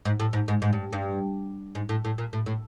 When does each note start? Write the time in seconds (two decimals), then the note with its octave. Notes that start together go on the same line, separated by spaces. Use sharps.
0.05 G#2
0.20 A2
0.33 G#2
0.48 G#2
0.62 G#2
0.73 G2
0.93 G2
1.75 G#2
1.89 A2
2.05 A2
2.18 A#2
2.33 A2
2.46 A2